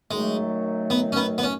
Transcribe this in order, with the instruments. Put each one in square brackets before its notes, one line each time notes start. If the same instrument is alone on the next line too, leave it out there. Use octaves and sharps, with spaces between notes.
[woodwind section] F#2 D#3 F#3 A3 [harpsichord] G#3
[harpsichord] B3
C#4
B3
B3
C#4